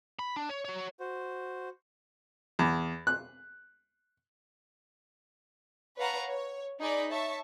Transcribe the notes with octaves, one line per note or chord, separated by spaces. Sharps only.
B5
D4
C#5
F#4 C#5
F#4 C5
E2
F#6
B4 C#5 F5 F#5 A5 A#5
C#5
D#4 G#4 D5 B5
C#5 E5 A5 C#6